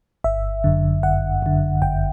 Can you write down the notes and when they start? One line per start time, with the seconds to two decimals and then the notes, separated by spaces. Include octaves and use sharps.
0.24 G1 E5
0.64 F#2 D3
1.03 G1 F#5
1.42 F#2 D3
1.82 G1 G5